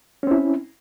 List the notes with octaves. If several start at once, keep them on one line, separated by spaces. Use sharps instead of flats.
C4 C#4 E4